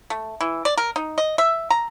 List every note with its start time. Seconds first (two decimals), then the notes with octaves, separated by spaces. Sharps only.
0.10 A3
0.41 E3
0.65 D5
0.78 A#4
0.96 D#4
1.18 D#5
1.38 E5
1.71 A#5